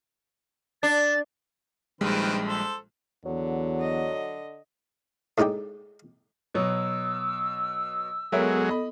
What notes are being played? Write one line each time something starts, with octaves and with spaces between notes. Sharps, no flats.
D4 A6
A#1 D#3 G3 G#3 C4 B4
A4 C5
E2 D3 F#3
D#5
A2 G#3 D#4 D5 G5
B2 F#3 E6
F#3 G#3 B3 A4 A#4 C#5 E5
D#5 B5